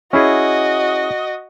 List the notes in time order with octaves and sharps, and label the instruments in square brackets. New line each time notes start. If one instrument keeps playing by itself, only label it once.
[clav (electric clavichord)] C#4 E4 G#4 [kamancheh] F#4 D#5